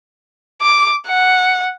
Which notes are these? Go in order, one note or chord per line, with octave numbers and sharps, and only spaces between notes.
D6
F#5